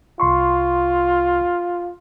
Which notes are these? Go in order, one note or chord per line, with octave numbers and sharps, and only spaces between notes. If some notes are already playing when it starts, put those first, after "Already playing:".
C2 F4 C6 C#6